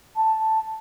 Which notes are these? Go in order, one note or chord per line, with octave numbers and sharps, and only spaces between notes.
A5